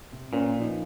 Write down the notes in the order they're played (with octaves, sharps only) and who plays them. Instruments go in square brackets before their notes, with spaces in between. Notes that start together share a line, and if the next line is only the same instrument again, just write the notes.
[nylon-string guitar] C3
[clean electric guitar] A#2 [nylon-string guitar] C#4 B4 C5
[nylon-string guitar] F3 D#4